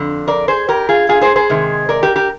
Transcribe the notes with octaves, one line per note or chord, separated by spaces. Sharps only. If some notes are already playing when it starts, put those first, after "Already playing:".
Already playing: F2 D3
A#4 D5
G#4 C5
G4 A#4
F4 G#4
F4 G#4
G#4 C5
G#4 C5
C3 D#3 G#3
A#4 D5
G4 A#4
G4 A#4